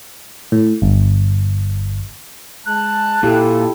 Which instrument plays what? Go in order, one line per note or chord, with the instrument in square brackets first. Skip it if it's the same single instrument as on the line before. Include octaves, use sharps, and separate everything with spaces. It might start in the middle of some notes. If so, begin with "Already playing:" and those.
[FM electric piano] A2
G1
[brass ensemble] G#3 A5 [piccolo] F#6
[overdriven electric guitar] A#2 [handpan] E4 G4 [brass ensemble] A4